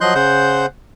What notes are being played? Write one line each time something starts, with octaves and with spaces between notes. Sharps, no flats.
F3 F#3 D#5 C6 F#6 G6
C#3 C5 F#5 G6